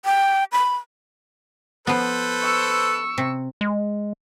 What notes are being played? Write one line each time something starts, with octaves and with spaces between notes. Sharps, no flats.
G5
B5
F3 B3 A4 B4 C5
C#6 E6
C3
G#3